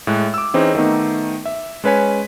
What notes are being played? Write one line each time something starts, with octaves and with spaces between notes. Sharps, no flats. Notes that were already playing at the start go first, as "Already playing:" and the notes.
A2 G#3 F#6
D6 E6
E3 C4 C#4 D#4 G#4 C5
D#3 A3 B3 D#4
E5
G#3 C#4 B4 C#5 G#5 B6